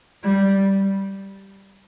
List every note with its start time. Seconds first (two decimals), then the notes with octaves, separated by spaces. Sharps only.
0.23 G3